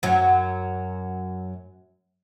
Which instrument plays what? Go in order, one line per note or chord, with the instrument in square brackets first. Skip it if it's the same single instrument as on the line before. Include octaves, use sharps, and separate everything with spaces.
[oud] F#2 F#3